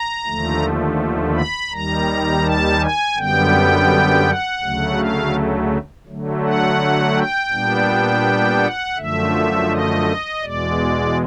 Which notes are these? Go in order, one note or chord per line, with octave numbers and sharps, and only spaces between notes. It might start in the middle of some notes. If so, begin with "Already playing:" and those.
Already playing: A#5
D#2 D3 F3 A3
B5
D#2 D#3 G3 A#5
A5
G#5
F#2 D3 G3 B3 G5
F#5
D2 C#3 F#3 A3
F5
D3 F#3 A3
F#5
G5
A#2 G3 B3 D4
F#5
F#2 D3 F3 A3 E5
D#5
E2 B2 G#3 D5